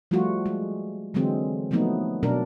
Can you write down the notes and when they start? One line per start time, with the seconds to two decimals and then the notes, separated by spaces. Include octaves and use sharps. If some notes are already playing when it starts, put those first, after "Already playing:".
0.11 F3 G3 A3 F4 F#4
0.46 G#3
1.14 D3 E3 F#3 G#3 C4
1.71 F3 F#3 A3 B3 D#4
2.23 B2 F#3 D4 A#4